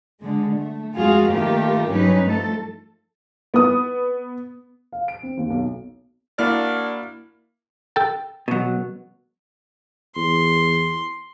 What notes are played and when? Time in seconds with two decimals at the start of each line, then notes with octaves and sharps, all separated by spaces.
0.20 D3 G#3
0.56 A3
0.96 F2 G#3 F4 F#4 G#4 F5
1.30 D#3 A3 A#3 F4 G4 A#4
1.88 G2 F#3 C#4 D#4 B4
2.25 F3 A3 A4
3.54 B3 D#6
4.93 F5
5.08 D7
5.23 C4
5.37 D#2
5.50 B1
6.39 A#3 D4 E4 F#4 D5 F6
7.96 A4 G5 A5
8.48 B2 F#3
10.16 E2 C6